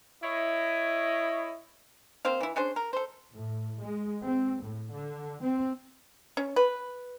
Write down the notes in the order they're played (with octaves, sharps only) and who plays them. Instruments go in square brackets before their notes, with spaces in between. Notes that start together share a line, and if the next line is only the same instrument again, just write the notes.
[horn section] E4 C#5 D#5
[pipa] A#3 C4 C5 F5
E3 E4
C#4 D4 G#4 C5
A#4
A4 C5
[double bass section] A2
G#3
C4
A2
D3
C4
[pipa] C#4
B4